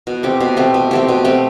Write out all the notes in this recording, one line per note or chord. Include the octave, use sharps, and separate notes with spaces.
B2
A3 C4 G4
B2
A3 C4 G4
B2
A3 C4 G4
B2
A3 C4 G4